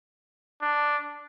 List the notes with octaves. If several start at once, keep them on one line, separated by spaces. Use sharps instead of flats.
D4